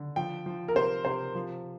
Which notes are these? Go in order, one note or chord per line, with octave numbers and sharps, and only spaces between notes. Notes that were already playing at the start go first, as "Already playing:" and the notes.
Already playing: D3
F3 G5
F3
A#4
C3 C5
C3 C5
F3